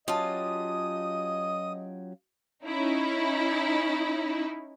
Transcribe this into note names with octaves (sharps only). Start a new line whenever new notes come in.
F#3 C#4 F4 G4 D#5 A5 D#6
C#4 D#4 E4